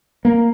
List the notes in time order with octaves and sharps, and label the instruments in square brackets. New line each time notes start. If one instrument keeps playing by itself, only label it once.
[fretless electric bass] A#3